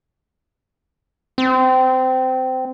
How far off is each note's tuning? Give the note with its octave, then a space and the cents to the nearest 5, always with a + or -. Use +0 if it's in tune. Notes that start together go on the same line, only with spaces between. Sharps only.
C4 -20